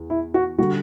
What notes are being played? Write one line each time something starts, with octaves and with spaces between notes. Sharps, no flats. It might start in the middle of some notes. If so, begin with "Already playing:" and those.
Already playing: E2
E4
F#4
D3 G3 F#4